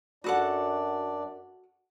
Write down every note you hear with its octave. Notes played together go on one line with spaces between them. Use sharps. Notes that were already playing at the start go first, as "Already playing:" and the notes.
F#2 D4 F#4 A4 D5 F#5